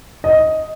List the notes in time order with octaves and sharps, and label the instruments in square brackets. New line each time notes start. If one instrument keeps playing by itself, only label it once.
[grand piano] D#5